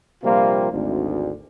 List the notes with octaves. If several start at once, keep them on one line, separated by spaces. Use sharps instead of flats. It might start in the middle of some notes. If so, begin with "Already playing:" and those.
A#1 C3 G3 A#3 C4 F4
G#1 D2